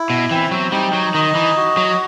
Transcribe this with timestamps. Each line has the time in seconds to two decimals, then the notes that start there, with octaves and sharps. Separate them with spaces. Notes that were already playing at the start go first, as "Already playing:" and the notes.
Already playing: E4
0.10 B2
0.30 E3 C4
0.51 F#3
0.72 G3 D#4
0.93 F#3
1.14 D#3 D#5
1.35 E3
1.57 F#4
1.77 F#3